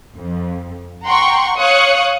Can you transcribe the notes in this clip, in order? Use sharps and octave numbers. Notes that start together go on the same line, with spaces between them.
F2
F#5 G5 A#5 C6 C#6
C#5 F5 C#6 D#6 F#6 C#7